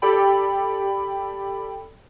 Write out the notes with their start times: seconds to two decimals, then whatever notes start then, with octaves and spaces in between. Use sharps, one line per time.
0.02 G4 A4 D5 G5 B5